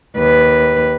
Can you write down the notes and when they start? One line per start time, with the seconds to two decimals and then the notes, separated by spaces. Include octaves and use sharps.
0.17 D#2 B4